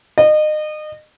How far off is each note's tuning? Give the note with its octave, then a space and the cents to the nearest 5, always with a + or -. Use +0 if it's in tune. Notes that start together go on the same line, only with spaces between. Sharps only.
D#5 -30